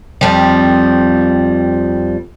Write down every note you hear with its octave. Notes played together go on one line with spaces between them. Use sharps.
F2 G3